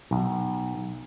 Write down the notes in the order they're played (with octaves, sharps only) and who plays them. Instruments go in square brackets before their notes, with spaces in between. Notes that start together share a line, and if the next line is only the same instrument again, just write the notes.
[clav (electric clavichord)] B1